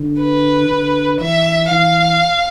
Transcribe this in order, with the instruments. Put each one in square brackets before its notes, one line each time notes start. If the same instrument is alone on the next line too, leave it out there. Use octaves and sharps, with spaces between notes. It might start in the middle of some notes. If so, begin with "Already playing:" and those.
Already playing: [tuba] D3
[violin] B4
[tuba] D3
[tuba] E3 [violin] E5
[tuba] E3 [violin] F5